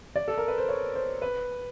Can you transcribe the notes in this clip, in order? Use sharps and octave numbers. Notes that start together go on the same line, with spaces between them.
D5
A4
A#4
B4
C5
C#5
C5
B4